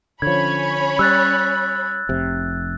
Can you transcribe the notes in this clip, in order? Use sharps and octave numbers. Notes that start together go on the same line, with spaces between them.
D3 F3 C#4 C#5 B5 G#6
G3 E6 F#6 A6
F1 C3